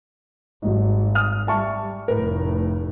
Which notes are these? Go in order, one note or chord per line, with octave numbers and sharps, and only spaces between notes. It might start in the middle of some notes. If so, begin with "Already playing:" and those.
G#1 F#3 G3 D#4
D#6 F6
G3 E5 A5 C#6
F1 A2 A#4 B4